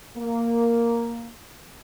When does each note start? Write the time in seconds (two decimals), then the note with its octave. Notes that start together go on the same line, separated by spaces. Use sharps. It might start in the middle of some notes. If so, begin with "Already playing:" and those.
0.17 A#3